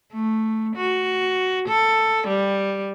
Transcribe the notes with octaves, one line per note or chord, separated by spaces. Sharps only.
A3
F#4
A4
G3